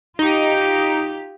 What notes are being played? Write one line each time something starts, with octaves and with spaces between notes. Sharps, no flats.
D#4 F4 G4